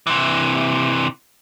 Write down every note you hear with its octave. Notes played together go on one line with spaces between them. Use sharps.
C3 E3